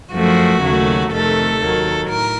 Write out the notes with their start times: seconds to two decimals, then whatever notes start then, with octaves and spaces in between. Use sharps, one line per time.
0.13 F#2 F3 A3 F#4
0.62 D#2 C#3 F#3 A3
1.12 F2 C3 D#3 A3 A4
1.59 D#2 D#3 F#3
2.09 A2 A#4